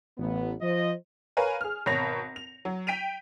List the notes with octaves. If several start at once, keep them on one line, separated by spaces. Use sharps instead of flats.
A1 B3
F3 C5 D#5
A#4 B4 C#5 F5 G#5
G#4 F6
G#1 B2 C#5 B5 A#6 F7
F7
F#3
G5 B6 D7 D#7 F7